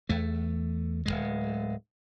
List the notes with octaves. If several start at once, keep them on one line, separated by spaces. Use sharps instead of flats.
E2 A3
D1 C#2 G#3